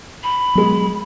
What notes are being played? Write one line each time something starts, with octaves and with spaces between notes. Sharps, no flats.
B5
B2 F#3 G#3